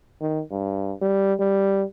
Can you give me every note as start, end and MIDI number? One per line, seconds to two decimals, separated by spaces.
0.21 0.42 51
0.51 0.93 43
1.02 1.34 55
1.39 1.84 55